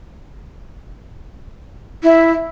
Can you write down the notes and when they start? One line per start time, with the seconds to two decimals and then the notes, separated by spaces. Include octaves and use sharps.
2.03 E4